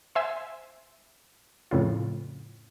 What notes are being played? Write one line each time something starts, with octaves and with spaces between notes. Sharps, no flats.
C5 E5 G#5 C6
F2 A2 C#3 F4